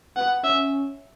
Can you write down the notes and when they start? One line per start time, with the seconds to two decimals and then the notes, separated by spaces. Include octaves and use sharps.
0.16 B3 F#5
0.44 C#4 E5